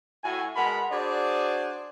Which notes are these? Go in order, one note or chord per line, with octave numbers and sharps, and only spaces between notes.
A2 F#4 G#5
B2 G#3 A#4 F#5 A5 B5
D4 F#4 G#4 C5 D5